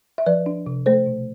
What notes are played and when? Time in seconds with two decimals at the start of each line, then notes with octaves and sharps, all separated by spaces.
0.18 E5
0.26 F3 B4 D5
0.46 D4
0.66 C3
0.86 A3 A4 C5
1.06 B2